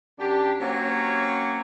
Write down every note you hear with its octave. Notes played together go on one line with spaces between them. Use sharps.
F#2 D4 G4
F#3 A#3 C4 C#4 C#5